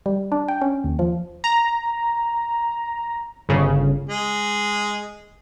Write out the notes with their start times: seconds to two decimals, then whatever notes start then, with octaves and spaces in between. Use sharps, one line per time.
0.06 G3
0.32 D4
0.48 G5
0.61 C#4
0.84 D#2
0.99 F3
1.44 A#5
3.49 G1 C#3
4.09 G#3